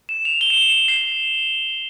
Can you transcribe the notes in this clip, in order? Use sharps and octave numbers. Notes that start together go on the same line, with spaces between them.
E7
F7
G7
E7
F7
E7
C7